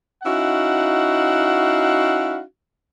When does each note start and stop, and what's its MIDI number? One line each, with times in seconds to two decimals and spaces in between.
0.24 2.41 61
0.24 2.41 63
0.24 2.41 64
0.24 2.41 66
0.24 2.41 77
0.24 2.41 78